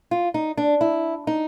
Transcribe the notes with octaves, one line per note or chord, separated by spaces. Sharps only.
F4
D#4
D4
E4
D#4